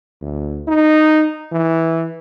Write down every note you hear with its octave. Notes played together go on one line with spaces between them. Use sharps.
D2
D#4
E3